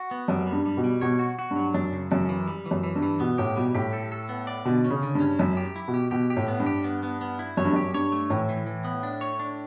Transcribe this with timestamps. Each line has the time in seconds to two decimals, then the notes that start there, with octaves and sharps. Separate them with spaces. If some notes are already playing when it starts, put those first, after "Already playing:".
Already playing: F#4
0.11 B3
0.28 F#2 G3
0.47 G3
0.52 G2
0.66 G3
0.77 B2
0.84 G3
1.01 B2 C#5
1.19 F#4
1.39 F#4
1.51 G2
1.56 F#3
1.74 F#2 D4
1.92 C#3
2.11 F#2 C#3
2.29 E3
2.47 G3
2.66 E3
2.71 F#2
2.83 E3
2.96 G2
3.03 E3
3.20 B2 B3
3.38 A2 G4
3.56 B2 G3
3.74 A2 G4
3.93 A4
4.12 A4
4.29 B3
4.47 D5
4.65 B2 D3
4.84 C#4
4.90 C#3
5.03 D3
5.15 G2
5.20 C#4
5.39 F#2 E4
5.57 G4
5.76 E4
5.88 B2
5.94 G4
6.11 B2 G4
6.30 G4
6.37 A2
6.48 B3
6.60 G2
6.66 G4
6.84 B3
7.03 B3
7.21 B3
7.39 E4
7.57 F#2 C#5
7.65 G2
7.73 F#2 G4
7.94 G2 C#5
8.12 A3
8.30 A2 E3
8.49 E3
8.66 E3
8.85 B3
9.03 D4
9.21 C#5
9.39 D4